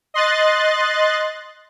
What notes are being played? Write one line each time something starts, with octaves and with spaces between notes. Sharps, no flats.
D#5 C6 F#6 A6